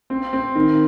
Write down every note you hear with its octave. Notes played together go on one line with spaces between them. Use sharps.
C4
C4
D#3